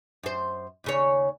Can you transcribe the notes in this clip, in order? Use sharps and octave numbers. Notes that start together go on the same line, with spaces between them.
F#2 C5
D#2 C#3 C#5